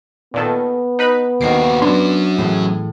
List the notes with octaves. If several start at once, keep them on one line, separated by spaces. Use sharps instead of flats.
A#2 D#3 B3 A4
D#4 B4 B5
D#2 D#3 F#4 C7 D7
F#3 C#4 D4 C6
A2 E3 G#4